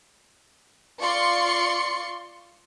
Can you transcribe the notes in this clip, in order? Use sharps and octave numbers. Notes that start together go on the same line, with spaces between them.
F4 D5 C6 C#6 C#7